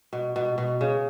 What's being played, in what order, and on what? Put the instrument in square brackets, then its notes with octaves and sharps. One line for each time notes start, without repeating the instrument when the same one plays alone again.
[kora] B2
B2
B2
C#3